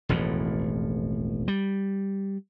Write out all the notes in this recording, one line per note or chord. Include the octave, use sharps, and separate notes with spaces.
E1 A1 F2 A2
G3